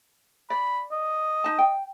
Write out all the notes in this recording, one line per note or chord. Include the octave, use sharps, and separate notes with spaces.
D5 B5
D#5
D#4 A5
G5